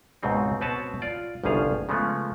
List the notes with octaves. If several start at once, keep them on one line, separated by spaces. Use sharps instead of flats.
C#2 G#2 B2 C4 D#4
B2 C4 B4 C#5 A5
F4 D5
G1 C2 C#3 F3 G#4 F5
C#3 F3 G#3 A3 B3